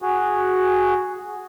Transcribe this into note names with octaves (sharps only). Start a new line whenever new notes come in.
F#4 G#4